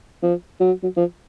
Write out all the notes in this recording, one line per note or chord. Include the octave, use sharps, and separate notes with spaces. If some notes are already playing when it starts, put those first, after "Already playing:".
F3
F#3
F#3
F3